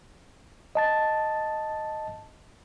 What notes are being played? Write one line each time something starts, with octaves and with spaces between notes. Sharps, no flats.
D#5 A5 A6